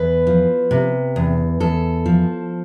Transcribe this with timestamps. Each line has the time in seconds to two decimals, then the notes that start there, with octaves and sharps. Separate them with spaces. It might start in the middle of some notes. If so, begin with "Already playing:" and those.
Already playing: E2 B4
0.27 F3
0.71 C3
1.16 E2
1.60 E2 A4
2.06 F3